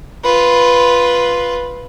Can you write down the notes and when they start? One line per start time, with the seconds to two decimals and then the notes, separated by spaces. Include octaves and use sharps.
0.24 F4 B4